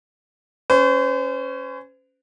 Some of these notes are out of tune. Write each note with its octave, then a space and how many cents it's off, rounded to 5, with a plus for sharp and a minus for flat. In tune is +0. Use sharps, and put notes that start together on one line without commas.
C#4 +0 C5 -40